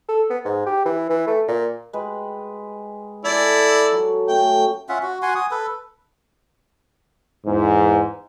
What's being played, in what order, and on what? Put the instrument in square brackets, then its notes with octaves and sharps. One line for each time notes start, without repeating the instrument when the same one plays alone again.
[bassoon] A4
B3
G#2
G4
E3
E3
A3
A#2
[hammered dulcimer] G#3 B4 G5
[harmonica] E4 D5 [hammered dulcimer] A4 G#5
[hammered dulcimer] F#3
[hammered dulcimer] A3 C#4 [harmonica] G5
[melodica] C#4 F4 E5 F#5
F#4
F#4 F#5 G#5 C6
G#5 D#6
A4 B4
[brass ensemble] E2 G#2